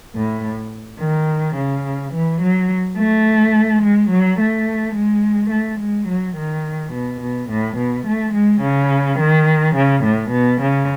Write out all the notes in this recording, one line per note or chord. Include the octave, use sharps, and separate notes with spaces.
A2
D#3
C#3
E3
F#3
A3
G#3
F#3
A3
G#3
A3
G#3
F#3
D#3
B2
B2
A2
B2
A3
G#3
C#3
D#3
C#3
A2
B2
C#3